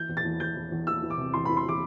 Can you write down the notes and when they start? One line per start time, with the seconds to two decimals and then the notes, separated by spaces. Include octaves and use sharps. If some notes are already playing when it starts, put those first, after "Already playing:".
Already playing: E3 G6
0.09 E2
0.17 A6
0.25 E2
0.40 E2 G6
0.56 E2
0.72 E2
0.87 E3 E6
1.03 E3
1.10 D6
1.18 C3
1.34 E2 C6
1.45 E3 B5
1.57 C6
1.65 E3 D6